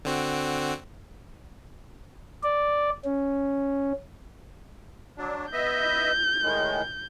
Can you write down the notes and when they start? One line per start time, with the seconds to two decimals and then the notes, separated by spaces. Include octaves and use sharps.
0.05 D3 C4 F#4
2.43 D5
3.05 C#4
5.18 F#3 D4
5.53 B3 D#5 E5 G6
6.43 A2 D#3 G#3